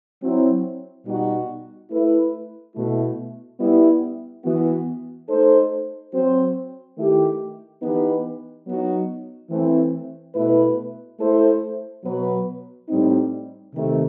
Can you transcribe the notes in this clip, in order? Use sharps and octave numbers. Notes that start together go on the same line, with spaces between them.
F#3 C4 E4
B2 G3 D#4 F#4
A3 E4 B4
B2 A3 E4
G3 B3 E4
E3 B3 F#4
A3 D#4 A4 C5
F#3 C4 F#4 C5
D#3 A3 E4 G4
E3 B3 D#4 G4 B4
F#3 B3 D#4 F#4
E3 A3 C4
B2 A3 E4 B4
A3 E4 A4 C5
B2 F#3 B3 F#4 B4
A2 G3 C4 D#4
C3 D#3 A3